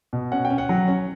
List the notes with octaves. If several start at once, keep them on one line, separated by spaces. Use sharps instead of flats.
B2
C#4 F#5
G5
C#4
F#5
F#3
C#4